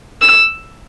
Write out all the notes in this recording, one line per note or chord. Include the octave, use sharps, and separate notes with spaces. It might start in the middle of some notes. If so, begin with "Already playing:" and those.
E6